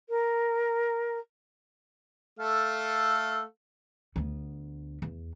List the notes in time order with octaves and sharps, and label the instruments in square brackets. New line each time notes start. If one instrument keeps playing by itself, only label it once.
[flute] A#4
[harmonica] A3 A4 F5
[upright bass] D2 B3
E2